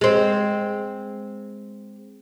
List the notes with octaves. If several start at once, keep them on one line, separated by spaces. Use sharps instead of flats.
G#3 C4